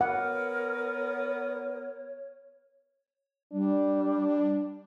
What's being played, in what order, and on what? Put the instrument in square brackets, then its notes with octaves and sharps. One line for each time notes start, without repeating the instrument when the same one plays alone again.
[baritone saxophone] B3 [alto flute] A#4 [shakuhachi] C#5 [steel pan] F#5
[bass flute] G3 [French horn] D4